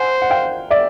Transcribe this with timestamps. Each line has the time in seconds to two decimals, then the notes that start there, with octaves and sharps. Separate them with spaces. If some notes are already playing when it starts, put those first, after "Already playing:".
Already playing: C5 F#5 G#5
0.22 F#5
0.30 F5 G5
0.71 D5 E5